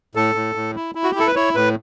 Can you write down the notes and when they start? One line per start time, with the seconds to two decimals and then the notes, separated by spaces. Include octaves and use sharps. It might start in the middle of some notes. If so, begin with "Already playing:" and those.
0.15 A2 A4
0.35 A2
0.55 A2
0.75 E4
0.95 E4
1.04 F#4
1.11 G4
1.15 E4 A4
1.27 B4
1.36 E4 C#5
1.55 A2 B4